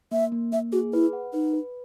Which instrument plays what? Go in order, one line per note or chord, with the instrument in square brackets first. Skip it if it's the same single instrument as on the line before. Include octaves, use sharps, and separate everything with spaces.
[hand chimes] A#3 [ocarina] E5
[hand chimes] A#3
[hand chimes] A#3 [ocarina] E5
[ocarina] F#4 [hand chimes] G#4
[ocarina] E4 [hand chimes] B4
[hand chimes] F#5
[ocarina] D#4 [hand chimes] B4
[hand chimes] B4